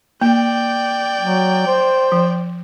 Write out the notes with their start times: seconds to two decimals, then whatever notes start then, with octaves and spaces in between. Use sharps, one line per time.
0.21 A#3 D5 G5
1.20 F#3
1.67 C5
2.12 F3